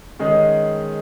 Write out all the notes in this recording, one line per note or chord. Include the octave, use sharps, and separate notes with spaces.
D#3 G#3 C#4 G#4 D#5